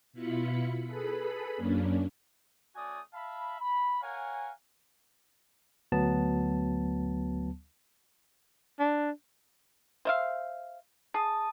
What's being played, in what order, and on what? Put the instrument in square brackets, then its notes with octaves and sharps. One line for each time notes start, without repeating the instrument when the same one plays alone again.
[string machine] B2 E4 F4 B5 C#7
G#4 A4 B4 B5
F#2 A#3 C#4 D4
[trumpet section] A3 C#4 F#4 D5 G#5 D#6
E5 F5 A5 B5
B5
A#4 C#5 F5 F#5 G#5
[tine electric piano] D2 F#3 B3 A5
[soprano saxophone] D4
[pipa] C5 E5 F5
[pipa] G#4 [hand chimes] A5 D#6